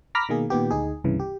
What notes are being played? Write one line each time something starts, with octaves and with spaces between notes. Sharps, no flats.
A#5 B5 D6 F6 A#6 B6
B2 D#3 A#3 G#4
A#2 D#3 B3 G4
D2 D#4 G#4
C2 G2 C#3 E3
G4